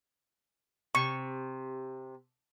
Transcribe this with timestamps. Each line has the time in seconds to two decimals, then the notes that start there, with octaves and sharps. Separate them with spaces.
0.95 C3 C#6